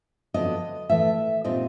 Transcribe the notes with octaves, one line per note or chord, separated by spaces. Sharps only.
F2 D3 F#3 B3 D4 D#5
A2 E3 A3 E5
A#2 G3 C4 D#4 D#5